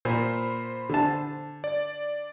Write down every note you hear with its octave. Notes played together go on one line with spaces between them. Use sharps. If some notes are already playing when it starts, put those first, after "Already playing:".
A#2 C5 B5
D3 A5
D5